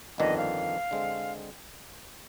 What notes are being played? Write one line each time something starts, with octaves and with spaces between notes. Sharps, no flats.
G1 F2 D#3 B3 D4 D#5
F5
D3 G#3 C4